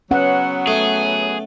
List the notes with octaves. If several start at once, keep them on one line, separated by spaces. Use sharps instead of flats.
F#3 B3 C#4 F#5
A3 G#4